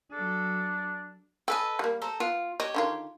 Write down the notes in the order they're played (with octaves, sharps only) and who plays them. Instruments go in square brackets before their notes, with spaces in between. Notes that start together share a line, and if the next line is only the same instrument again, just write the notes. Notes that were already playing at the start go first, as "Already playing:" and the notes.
[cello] F#3 A4 [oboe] D4
[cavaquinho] A4 B4 D#5 [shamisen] G5 G#5
[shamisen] G3 A#3
[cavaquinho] A4 C5 A#5
[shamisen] B3 [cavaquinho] F4
[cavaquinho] G4 C#5 [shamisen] D#5
[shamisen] D3 D#3 F4